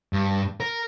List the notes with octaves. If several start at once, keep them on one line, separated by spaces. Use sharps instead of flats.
G2
A#4